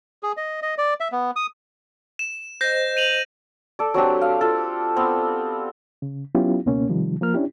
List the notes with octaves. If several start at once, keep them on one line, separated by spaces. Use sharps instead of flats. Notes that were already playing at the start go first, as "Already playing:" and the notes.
G#4
D#5
D#5
D5
E5
B3
D#6
E7
C5 D#5 G6 A#6
D#7 F7 F#7
A4 D5
F#3 C4 D4 G4
F5
F4 A4
B3 C4 C6
C#3
F#3 B3 C#4 E4 F4 G4
C#2 B2 A#3 C#4
C3 D#3 F3 G3
F3 A#3 A#4 F6
C#4 D4 E4 G4